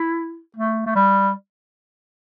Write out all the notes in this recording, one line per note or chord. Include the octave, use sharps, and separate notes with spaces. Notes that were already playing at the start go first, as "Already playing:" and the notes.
Already playing: E4
A3
A3
G3